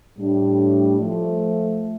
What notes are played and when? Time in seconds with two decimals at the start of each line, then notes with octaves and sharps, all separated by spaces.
0.18 A2 G3 D4
0.99 F3 A3